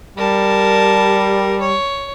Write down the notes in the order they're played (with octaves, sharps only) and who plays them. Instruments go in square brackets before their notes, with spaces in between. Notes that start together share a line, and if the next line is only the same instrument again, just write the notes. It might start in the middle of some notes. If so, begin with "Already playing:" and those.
[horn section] G3 [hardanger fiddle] A#4 A5
[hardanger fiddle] C#5